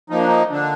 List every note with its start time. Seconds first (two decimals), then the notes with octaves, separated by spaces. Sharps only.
0.10 F3 A#3 D#4
0.19 D4
0.27 D#4
0.51 D3 D4